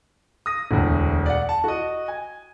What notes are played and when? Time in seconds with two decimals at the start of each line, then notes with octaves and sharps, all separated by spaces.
0.46 D#6 A#6
0.71 E1 D2
1.26 D5 F#5
1.49 A5
1.64 F#4 D#5
2.08 G#5